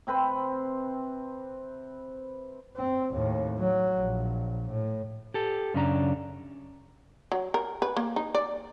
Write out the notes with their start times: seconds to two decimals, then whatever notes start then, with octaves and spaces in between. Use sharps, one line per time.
0.07 C3 C4 B4 C6
2.76 C4
3.11 D#2 A2
3.59 F#3
3.96 A#1
4.69 A2
5.34 G4 A4
5.74 F#2 C#3 C#4 D4 A#5
7.32 F#3
7.54 A#4
7.82 B4
7.97 A#3
8.16 D#4
8.35 D5